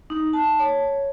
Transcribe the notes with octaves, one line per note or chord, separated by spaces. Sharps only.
D#4
A5
C#5